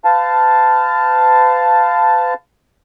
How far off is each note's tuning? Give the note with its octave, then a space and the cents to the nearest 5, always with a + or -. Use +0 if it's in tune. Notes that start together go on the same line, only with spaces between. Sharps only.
B4 +45 F5 +0 A5 +0